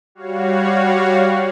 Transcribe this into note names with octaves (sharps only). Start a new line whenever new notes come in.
G3 F#4 C#5 F5